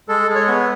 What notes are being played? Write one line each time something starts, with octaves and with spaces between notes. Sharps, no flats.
G#3 A4
G#3
C#5
B3